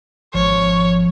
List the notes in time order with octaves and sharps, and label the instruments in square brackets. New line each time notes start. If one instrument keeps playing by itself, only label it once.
[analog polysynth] G#1 [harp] F3 [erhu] C#5